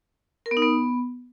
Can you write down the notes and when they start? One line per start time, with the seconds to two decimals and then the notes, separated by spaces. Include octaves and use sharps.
0.46 A#4
0.51 B3
0.57 D#4
0.62 B3